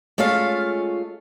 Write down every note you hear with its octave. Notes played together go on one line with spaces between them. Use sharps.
G#3 A3 C#4 F4 F5